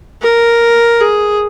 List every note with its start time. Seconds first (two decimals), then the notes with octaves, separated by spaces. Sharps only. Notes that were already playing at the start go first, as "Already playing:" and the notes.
0.22 A#4
1.01 G#4